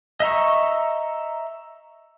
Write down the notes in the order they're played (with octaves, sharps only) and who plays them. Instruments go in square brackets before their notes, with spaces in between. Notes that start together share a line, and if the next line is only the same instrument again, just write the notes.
[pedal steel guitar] D#5 E5 A#5 C#6